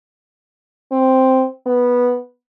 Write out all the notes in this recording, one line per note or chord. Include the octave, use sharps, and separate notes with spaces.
C4
B3